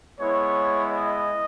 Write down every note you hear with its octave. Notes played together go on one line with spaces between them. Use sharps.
G#3 B3 E4 C#5
D#5